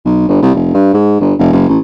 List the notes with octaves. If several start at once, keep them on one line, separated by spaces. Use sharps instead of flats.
B1
G1
C2
F1
G2
G#2
G1
F1
F#1
A1